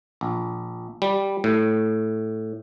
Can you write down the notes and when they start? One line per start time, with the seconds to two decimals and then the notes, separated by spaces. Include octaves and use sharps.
0.21 A#1
1.02 G3
1.44 A2